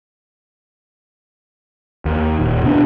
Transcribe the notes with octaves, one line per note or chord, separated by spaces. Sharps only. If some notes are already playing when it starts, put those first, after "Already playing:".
D#2
D#1
B2 B3 D4